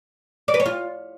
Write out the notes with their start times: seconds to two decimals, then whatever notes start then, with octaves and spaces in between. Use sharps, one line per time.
0.48 D5
0.54 B4
0.60 C#5
0.66 F4